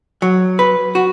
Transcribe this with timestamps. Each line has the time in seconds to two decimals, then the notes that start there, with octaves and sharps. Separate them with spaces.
0.22 F#3
0.59 B4
0.95 F#4